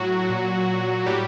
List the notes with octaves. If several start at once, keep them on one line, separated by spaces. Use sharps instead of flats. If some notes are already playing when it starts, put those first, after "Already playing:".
Already playing: A2 F#3 F#4
A#2
A2 G3 G4